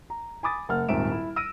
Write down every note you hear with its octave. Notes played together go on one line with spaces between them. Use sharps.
A#5
G#5 B5 D6 D#6 A6
F#1 F#5 F6
D#1 G#2 C4 E5 D7 E7
E4
E6 F6 A#6 D7 D#7